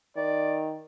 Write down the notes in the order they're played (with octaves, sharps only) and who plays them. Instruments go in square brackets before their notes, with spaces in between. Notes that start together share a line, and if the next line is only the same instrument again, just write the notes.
[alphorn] D#3 [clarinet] D5